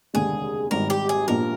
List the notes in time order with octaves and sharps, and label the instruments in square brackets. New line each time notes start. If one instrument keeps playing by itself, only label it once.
[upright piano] F1 D#2 D3 G#3 [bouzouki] G#4
[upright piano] G#1 G#2 G3 [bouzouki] A#4
[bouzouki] G4
G#4
[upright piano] A#1 A#2 F3 [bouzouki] A#4